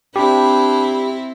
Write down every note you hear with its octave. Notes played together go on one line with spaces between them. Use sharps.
C4 D4 E4 G4 B5